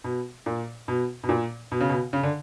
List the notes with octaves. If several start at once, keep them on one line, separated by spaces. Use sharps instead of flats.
B2
A#2
B2
B2
A#2
B2
C#3
B2
C#3
D3